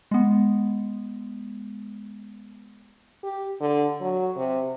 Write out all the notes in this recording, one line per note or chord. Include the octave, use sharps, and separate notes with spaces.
G#3 B3
G4
D3
F#3
C3